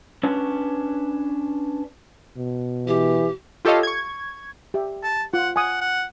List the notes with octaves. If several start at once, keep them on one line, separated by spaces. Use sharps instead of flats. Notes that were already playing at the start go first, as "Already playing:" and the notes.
C#4 D4 B4 C#5
B2
E3 G4
F4 G4 A4 C#5 D#5 F5
C#6 G#6
G4 E5
A5
F4 F#5
F#5 G#5 D#6
F#5